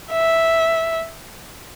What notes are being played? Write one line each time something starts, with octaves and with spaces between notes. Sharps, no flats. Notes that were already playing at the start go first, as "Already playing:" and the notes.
E5